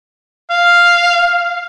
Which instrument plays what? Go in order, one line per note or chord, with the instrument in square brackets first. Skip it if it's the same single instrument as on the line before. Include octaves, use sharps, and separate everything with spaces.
[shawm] F5